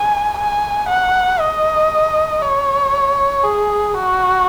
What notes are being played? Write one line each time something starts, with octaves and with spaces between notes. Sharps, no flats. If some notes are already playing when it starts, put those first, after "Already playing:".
Already playing: G#5
G#5
F#5
D#5
C#5
G#4
F#4